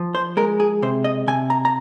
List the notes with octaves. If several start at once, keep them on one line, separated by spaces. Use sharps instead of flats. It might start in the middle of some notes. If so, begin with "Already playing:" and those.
Already playing: F3
C5
G#3 A#4
G#4
C3 C5
D#5
C3 G#5
A#5
A#5